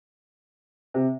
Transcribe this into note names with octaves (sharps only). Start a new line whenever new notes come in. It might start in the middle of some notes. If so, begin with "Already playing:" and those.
C3